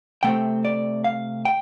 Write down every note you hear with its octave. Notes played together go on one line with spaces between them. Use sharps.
C3 A3 C4 G5
D5
F5
G5